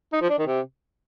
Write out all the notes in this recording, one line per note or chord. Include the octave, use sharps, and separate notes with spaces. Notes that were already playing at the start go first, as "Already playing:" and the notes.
D#4
F3
D4
D#3
C3